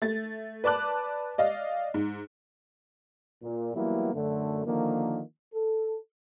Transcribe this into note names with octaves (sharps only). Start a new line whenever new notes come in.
A3 A6
B4 D5 A5 D6 F#6
D5 D#5 F5
G#2
A#2
E3 F#3 G3 A#3 B3 E4
F#2 D3 A3
D3 D#3 F3 A#3
A4